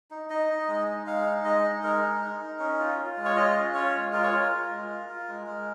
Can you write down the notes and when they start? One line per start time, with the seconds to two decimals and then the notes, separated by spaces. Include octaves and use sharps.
0.11 D#4
0.30 D#4 D#5
0.49 D#4
0.68 G#3
0.88 D#4
1.07 G#3 F5
1.26 D#4
1.45 G#3 D#5
1.64 D#4
1.83 G#3 A#4
2.02 D#4
2.21 D#4
2.40 D#4
2.59 C#4
2.79 F4
2.98 F4
3.18 G#3
3.25 C#5
3.36 F4 D#5
3.56 C#4
3.74 F4 C#5
3.94 G#3
4.13 F4 A#4
4.23 C#5
4.33 F4 A#4
4.52 F4
4.70 G#3
4.89 F4
5.09 F4
5.28 G#3
5.47 G#3